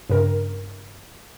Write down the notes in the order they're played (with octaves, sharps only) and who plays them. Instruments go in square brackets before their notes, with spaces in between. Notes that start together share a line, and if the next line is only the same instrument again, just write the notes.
[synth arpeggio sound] G2 C#3 A#4